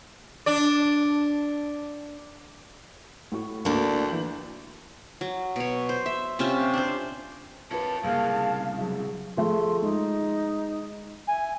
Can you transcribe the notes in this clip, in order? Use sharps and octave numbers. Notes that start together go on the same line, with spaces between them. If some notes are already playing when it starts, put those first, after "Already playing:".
D4 D5
A2 F#4 C#6
D2 A#3 D4
E3 G6 F#7
F#3
B2 C#5
C5
E5
C3 C#4 F4 E5
D4 C5
E4 F4 A#4 B4 C#5 A5
C2 C#3 G#3 A#3 C#4 F5
F#3 G#3 E4
F3 A3 G#4 C6
G#3 D#4
E5 G#5